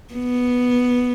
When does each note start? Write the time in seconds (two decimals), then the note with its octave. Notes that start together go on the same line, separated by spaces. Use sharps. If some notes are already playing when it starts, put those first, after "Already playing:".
0.14 B3